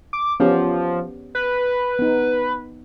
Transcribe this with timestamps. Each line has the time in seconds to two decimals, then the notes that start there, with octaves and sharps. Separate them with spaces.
0.13 D6
0.40 F3 B3 C#4 G4
1.35 B4
1.99 B3 D#4